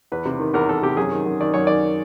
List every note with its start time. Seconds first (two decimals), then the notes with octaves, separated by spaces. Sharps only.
0.12 E2 B4
0.25 C3
0.40 D#3
0.54 E2 A#4
0.69 E2 A4
0.82 C3 G4
0.97 F#2 G#4
1.11 D#3
1.26 F#2
1.40 D#3 D5
1.54 F#2 C#5
1.67 D#3 D5